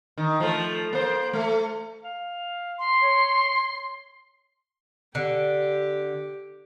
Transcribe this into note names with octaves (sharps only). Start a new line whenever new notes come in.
D#3
F3 A3
A#3 C5
A3
F5
C6
C#5
D3 G4